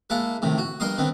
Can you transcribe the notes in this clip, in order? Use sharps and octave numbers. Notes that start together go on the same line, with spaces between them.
G#3 A#3 E4 F#5 A5
A2 C3 D#3
F#4
G2 A#4 D#5 C6 D#6
D3 D#3 B3 C4